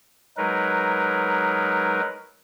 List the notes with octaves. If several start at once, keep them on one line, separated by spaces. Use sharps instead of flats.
F#3 G#3 D#4 A#4 B4